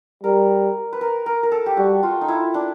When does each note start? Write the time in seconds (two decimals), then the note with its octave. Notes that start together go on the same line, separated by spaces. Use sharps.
0.24 G3 A#4
0.93 B4
1.01 A#4
1.26 A#4
1.43 A#4
1.52 A4
1.66 G4
1.77 G3 F#4
2.03 F4
2.21 D#4
2.28 E4
2.54 D4